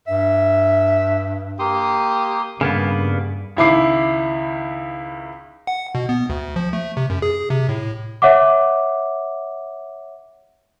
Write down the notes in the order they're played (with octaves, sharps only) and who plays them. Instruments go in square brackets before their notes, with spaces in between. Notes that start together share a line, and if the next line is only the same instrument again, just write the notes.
[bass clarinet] G2 [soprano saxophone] E5
[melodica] A#3 C6 D#6 [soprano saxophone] G4
[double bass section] G2 [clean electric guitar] C#3 A#3 B3
[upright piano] C#2 D#3 E4 B5 D6 C7
[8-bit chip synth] F#5
B2
B3
D2
F3
A3
C3
F#2
G#4
C3
A2
[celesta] C#5 E5 F#5 D6